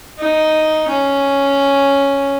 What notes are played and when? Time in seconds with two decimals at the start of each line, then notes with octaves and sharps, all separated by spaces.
0.19 D#4
0.88 C#4